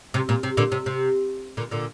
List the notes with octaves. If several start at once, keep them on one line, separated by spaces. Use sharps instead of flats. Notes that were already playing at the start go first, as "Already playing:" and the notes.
C3
A#2
C3
A#2 D3
C3
C3
A#2 D3
A#2 D3